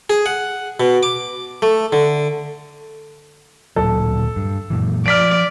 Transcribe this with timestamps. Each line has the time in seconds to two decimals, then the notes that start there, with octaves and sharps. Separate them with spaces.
0.10 G#4
0.26 F#5
0.80 B2
1.03 D6
1.62 A3
1.93 D3
3.76 D1 A#2 F#3 A4
4.36 G2
4.70 F#2 A#2 E3
5.06 F3 D5 F6 B6 D7